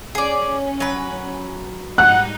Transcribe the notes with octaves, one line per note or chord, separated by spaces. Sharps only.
C#4 G#4 D5
F#3 B4
G#2 G3 D#4 F#5 F#6